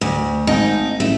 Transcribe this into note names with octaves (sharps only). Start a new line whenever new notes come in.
D2
G#1 D#4
A1 A3